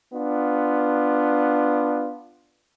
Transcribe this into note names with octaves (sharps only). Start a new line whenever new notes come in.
B3 D4 F4